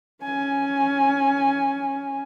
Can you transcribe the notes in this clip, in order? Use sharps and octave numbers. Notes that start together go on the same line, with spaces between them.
C#4 G#5